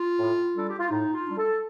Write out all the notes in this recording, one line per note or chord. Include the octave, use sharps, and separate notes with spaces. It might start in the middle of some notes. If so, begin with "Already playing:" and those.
Already playing: F4
A2
G3 D4 A4
G4
F4
A2 D#4
F4
G3 D4
A4